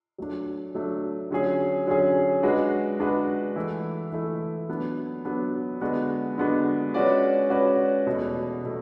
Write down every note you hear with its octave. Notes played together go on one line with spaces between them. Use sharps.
F#3 A3 D4
F#3 A3 D4
D3 F#3 C#4 G#4
D3 F#3 C#4 G#4
G#3 D4 F#4 B4
G#3 D4 F#4 B4
E3 A3 E4
E3 A3 E4
F#3 B3 D4
F#3 B3 D4
D3 G#3 B3 D4 F#4
D3 G#3 B3 D4 F#4
G#3 C#4 F#4 B4 D5
G#3 C#4 F#4 B4 D5
E2 B2 A3
B2 A3